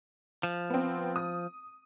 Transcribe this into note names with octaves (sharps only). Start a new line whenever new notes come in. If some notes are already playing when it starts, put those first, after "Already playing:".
F3
B3 C4
D#6